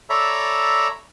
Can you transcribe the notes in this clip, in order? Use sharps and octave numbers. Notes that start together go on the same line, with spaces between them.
A4 C#5 D5 E5 A#5 B5